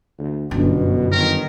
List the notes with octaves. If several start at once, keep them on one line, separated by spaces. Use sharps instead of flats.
D2
G1 F#2 B2 D4
G1 D#3 A#4